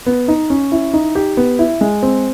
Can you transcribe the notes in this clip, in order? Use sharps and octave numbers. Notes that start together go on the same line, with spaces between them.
B3
D#4
C#4
E4
D#4
G4
B3
E4
G#3
C4